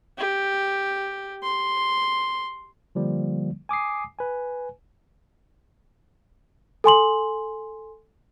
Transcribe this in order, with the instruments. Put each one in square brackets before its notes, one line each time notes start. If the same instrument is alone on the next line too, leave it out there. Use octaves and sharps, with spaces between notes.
[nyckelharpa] G4
C6
[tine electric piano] D3 F3 G3 A#3
G#5 D6 D#6 C7
B4 G#5
[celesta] A4 G#5 C6 F#7